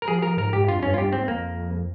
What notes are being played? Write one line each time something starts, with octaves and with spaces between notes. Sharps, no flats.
A#4
F3 G#4
F3 A#4
G#2 A#4
G#2 G4
G2 F4
F2
G2 C#4
F4
G2 G4
G#2 C4
F2 A#3